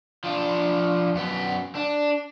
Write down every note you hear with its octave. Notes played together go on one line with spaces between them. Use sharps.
F3 D4
F#2 B3
D4